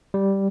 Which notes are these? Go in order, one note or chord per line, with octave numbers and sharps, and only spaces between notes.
G3